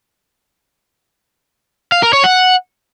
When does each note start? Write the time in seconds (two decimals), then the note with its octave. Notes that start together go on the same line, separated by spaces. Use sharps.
1.92 F5
2.03 A#4
2.13 C#5
2.24 F#5